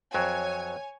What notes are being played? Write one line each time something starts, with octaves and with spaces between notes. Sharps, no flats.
F2 F#3 C#5 G#5